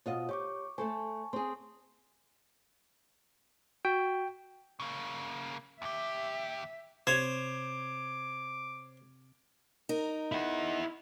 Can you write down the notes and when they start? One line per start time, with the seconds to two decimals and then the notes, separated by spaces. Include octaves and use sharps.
0.06 B2 F4 C5 D#5
0.29 G4 C#5 C#6 D6
0.78 A3 A4 C5 G#5 A5 C#6
1.33 C4 G#4 C6
3.85 F#4 G5
4.80 C#3 A#3
5.82 D#2 G4 E5
7.07 C3 C5 C#5 D6 G#6
9.89 D#4 A#4
10.32 E4 F#5